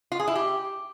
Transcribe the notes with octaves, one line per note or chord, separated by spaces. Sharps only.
F4
G#4
E4
G4